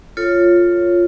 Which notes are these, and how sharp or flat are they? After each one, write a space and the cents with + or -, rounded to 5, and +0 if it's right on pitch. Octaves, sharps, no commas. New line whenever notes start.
F4 +0 A4 +20 C#5 +0